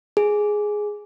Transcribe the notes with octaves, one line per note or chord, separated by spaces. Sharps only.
G#4